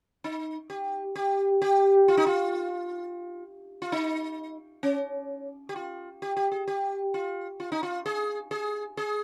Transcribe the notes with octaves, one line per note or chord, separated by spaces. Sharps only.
D#4
G4
G4
G4
F4
D#4
F4
F4
D#4
C#4
G4
F4
G4
G4
G#4
G4
F4
F4
D#4
F4
G#4
G#4
G#4